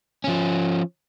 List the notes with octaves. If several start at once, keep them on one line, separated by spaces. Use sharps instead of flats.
F3 C#4